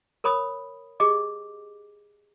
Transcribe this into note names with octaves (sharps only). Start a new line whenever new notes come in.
A#4 C#5 B5 D#6
G4 G#4 D#5 D6